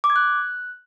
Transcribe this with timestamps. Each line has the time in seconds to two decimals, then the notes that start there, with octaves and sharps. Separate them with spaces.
0.04 D6
0.10 G#6
0.16 F#6